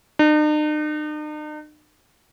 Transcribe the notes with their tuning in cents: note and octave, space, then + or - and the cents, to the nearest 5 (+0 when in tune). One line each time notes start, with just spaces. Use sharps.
D#4 -45